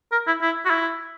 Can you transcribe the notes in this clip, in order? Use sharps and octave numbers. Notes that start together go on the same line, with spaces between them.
A#4
E4
E4
F#4
E4